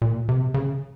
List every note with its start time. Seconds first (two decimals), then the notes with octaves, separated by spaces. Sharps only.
0.02 A#2
0.29 C3
0.54 C#3